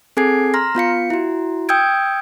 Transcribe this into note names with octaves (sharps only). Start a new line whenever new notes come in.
C4 G#4 A4 G#5 G#6 C7
A#5 C6 F6 A#6
B3 F4 F5 C#7
E4 F#4
G5 D#6 E6 G6 G#6 D7